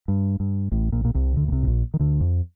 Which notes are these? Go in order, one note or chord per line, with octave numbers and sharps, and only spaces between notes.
G2
G2
A1 A2
A#1 A#2
A#2
C2 C3
D2 D3
A#2
C2 C3
A2
A#1 A#2
D#3
D2 D3
F2